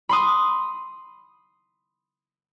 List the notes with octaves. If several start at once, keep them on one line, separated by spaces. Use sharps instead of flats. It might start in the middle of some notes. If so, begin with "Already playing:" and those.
B5 C6 D#6